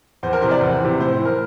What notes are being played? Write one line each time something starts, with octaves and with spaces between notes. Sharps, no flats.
E2 C5
A#4
C3 E3 C5
D5
E2 C5
C3 E3
A2 C5
C5
E3
A#4